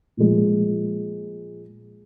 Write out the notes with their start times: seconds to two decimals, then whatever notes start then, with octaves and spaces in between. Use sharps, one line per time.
0.17 A#2 F3 G#3